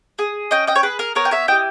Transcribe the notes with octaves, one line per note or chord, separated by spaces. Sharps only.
G#4
C#4 D#5 G5
D#5 G5
C#5
G#4 B4
A#4
B3 A#4 C#5
G5
C#5 E5
E4 G4 D#5 G5